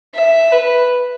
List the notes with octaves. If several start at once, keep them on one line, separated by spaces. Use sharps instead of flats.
E5
B4